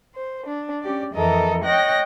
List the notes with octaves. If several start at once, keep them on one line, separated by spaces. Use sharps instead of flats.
C5
D4
C#4 G4 D5
F2 E3 A4 A#4 D#5
C#5 D#5 G5 F#6 A#6